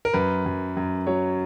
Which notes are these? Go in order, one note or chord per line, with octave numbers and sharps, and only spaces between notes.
A#4
F#2 B4
F#2
F#2
F#3 C#5